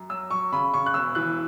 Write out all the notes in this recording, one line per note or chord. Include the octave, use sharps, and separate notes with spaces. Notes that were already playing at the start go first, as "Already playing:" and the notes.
Already playing: F#2
F#3 E6
F#3 C#6
C#3 B5
C#3 C#6
F#6
E1 E6
E3 F#6